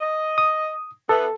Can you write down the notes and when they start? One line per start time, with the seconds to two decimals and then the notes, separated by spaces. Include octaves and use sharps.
0.01 D#5
0.38 D#6
1.09 E3 B3 A4